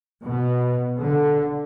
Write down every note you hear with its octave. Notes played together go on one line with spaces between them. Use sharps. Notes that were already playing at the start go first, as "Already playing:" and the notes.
B2
D3